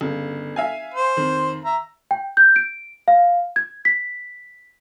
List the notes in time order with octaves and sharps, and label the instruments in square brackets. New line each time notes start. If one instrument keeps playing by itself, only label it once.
[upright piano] G1 C#3
E5 F5 G#5
[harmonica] C5
[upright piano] F2 D#3
[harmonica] E5 A#5
[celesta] G5
G6
D7
F5
G#6
B6